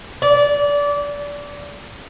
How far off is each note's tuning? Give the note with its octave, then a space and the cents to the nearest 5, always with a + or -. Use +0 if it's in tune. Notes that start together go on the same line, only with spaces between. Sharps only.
D5 -25